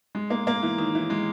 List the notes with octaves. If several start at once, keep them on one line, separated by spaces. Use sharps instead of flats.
G#3
A#3
A#3
E3
D#3
E3
G#3